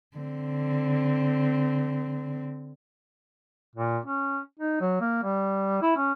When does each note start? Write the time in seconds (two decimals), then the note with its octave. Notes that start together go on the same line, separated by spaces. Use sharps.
0.17 D3 C4
3.76 A#2
4.06 C#4
4.59 D#4
4.81 F#3
5.01 A#3
5.24 G3
5.82 E4
5.97 C#4